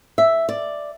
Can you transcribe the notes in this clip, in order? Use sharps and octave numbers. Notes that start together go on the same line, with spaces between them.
E5
D5